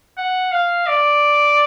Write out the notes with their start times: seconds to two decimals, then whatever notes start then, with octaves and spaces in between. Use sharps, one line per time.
0.17 F#5
0.51 F5
0.87 D5